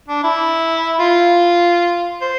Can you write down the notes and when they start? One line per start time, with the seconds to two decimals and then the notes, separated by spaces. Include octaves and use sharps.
0.08 D4
0.24 E4
1.00 F4
2.22 C5